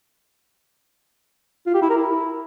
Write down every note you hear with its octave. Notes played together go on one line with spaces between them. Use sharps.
F4
G4
E4
A#4
E4